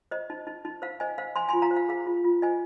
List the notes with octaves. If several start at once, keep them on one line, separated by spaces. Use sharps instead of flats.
C5 D#5
D#4
D#4
D#4
C5 F5
C5 D#5 G#5
C5 F5
C5 G#5 C6
F4 G#5 C6
F5 A#5
C5
F5
G#4 F5
F4
F4
C5 D#5 G#5